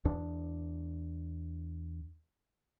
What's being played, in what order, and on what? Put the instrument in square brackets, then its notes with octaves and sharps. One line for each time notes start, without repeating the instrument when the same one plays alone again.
[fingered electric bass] E2 D4